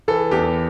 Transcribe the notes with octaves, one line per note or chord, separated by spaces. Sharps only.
E3 A4
E2 G4